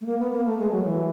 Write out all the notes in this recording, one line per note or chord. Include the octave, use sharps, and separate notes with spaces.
A3
A#3
B3
A#3
A3
G#3
F#3
E3